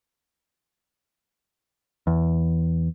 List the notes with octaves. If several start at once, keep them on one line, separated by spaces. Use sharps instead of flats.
E2